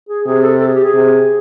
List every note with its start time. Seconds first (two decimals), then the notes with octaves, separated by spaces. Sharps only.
0.09 G#4
0.26 C3 G#4
0.42 A4
0.60 A4
0.67 G#4
0.75 G4
0.83 G#4
0.94 C3